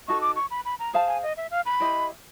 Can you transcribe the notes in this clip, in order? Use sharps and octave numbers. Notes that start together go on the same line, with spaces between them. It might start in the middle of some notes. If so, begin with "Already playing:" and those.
D#4 F#4 A4 C#6
D6
C#6
B5
B5
A#5
G#4 C5 F5 A5
G#5
D#5
E5
F5
B5
E4 G4 C5 D#5